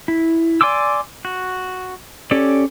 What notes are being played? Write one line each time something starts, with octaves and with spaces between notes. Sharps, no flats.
E4
D5 G#5 C6 D6 E6
F#4
C#4 G4 A4 D5